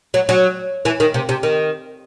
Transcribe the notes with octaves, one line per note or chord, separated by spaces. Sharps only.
F#3
F#3
E3
D#3
C3
C3
D#3